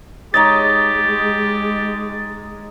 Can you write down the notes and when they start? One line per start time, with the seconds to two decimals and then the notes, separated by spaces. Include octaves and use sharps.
0.34 G#3 D#4 G4 C#5 D#5 A6